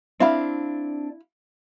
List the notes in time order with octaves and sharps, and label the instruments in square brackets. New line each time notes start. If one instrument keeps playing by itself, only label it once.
[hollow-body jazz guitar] C4 D4 [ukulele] E4 F5 B5